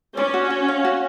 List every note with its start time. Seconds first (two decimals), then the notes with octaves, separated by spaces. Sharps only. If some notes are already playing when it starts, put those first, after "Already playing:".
0.17 C#4 D5
0.34 F#4
0.50 F#4
0.68 F5
0.85 F#4